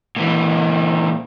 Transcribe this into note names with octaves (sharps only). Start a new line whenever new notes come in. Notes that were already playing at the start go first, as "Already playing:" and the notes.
A#2 E3